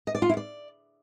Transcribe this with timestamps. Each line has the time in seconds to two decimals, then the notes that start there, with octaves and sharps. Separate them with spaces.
0.07 D#5
0.15 D5
0.22 F4
0.29 E4
0.37 D5